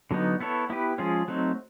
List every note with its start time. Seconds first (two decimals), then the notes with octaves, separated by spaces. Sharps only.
0.11 D3 F#3 B3 D#4
0.41 B3 E4 A4 C#5
0.70 B3 E4 G4 B4
0.98 F3 G#3 C#4 F4 G#4
1.28 F#3 A3 C4 D#4